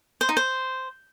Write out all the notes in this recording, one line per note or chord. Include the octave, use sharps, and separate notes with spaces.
C5
D#4
C5